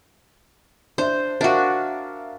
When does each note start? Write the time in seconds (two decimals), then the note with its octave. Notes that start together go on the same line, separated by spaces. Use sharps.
0.98 D4 C5 E5
1.41 D4 F#4 A#4 E5 F5